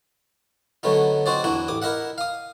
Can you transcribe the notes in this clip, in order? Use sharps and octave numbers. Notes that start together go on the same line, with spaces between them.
D3 F#3 A3 B3 D#4
C4 D#4 F#4 C5 D5
E2 D4 E4 F#4
A1 D6 D#6
E4 A#4 D#5 E5 F#5
F5 D#6